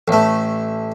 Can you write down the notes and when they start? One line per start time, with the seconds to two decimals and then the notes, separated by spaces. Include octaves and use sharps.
0.08 A1 A3